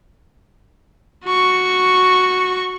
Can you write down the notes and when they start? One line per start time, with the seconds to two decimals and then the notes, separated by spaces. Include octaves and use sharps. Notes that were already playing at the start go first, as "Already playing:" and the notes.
1.24 F#4 C#6